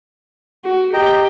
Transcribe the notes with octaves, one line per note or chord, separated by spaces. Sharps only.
F#4
G4 D#5 G5 A#5